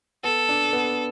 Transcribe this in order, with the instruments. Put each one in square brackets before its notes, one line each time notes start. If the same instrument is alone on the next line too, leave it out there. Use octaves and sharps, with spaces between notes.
[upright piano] B3 [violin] A4
[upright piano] D4
B3